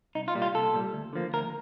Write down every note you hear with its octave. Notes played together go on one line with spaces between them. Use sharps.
C2 D#4
F4
A#2 G3
F4
C2 A4
A#2 G3
D2
D3 F3 A#3
D2 A#4